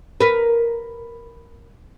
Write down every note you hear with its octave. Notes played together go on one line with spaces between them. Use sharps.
A#4 B4